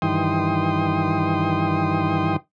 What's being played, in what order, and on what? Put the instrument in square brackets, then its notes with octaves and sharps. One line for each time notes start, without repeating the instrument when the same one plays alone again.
[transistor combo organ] G2 D#3 E3 G5 C6 D#6